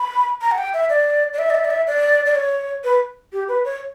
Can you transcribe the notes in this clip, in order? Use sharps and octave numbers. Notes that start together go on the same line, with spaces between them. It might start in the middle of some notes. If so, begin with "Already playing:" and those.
Already playing: B5
A#5
F#5
G5
E5
D5
D5
E5
D5
E5
D5
E5
D5
D5
C#5
B4
G4
B4
C#5